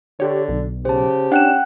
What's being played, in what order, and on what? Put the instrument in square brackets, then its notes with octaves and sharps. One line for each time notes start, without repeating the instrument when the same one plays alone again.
[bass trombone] D3 [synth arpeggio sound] G4 C#5
[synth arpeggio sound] B1
[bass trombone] C#3 [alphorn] G4 [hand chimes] C5 A5
[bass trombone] C#4 [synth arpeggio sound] D4 E7 [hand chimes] F#5 G5 F#6